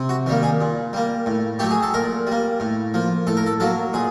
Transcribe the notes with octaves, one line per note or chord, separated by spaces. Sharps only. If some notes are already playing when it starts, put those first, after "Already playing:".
Already playing: C3
F#4
D#3 G3 A#3
G#4
A#2
G3 A#3
A2
F#3 A3 G4
G#4
A4
A#2 A#4
G3 A#3
A2
F3 A#3
A2 A4
A#4
A4
F#3 A#3 A4
A#2 G#4